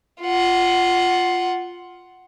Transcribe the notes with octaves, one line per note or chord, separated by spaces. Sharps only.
F4 F#5